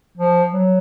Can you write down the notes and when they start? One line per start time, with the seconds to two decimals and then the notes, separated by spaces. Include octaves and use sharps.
0.18 F3
0.53 F#3